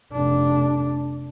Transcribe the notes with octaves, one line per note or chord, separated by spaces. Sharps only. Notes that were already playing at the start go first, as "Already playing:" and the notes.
F1 D4